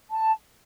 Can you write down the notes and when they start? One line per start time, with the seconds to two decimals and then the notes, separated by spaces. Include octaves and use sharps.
0.11 A5